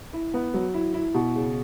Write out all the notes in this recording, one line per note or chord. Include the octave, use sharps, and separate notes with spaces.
E4
B3
F#3
E4
E4
B2
C#3